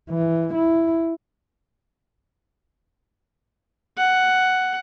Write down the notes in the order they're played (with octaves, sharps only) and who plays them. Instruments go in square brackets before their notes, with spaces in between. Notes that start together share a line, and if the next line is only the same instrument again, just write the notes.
[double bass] E3
E4
[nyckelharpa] F#5